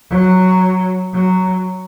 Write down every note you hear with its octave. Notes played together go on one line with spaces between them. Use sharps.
F#3
F#3